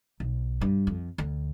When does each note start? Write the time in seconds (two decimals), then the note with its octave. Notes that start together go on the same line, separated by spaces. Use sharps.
0.20 B1
0.61 G2
0.87 F2
1.18 D2